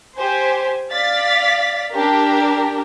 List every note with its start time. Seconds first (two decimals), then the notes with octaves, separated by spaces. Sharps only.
0.17 G4 C5 G#5
0.91 D5 F5 A6 B6
1.92 D4 G4 A#4